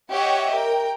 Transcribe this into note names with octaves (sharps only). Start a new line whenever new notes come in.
G4 C#5 D#5 E5 F#5
A#4 G5